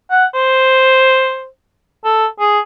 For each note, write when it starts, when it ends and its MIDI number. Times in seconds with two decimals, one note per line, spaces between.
0.11 0.25 78
0.34 1.46 72
2.05 2.26 69
2.40 2.60 68